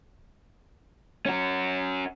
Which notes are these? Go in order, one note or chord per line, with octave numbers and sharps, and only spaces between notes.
C#4 F#4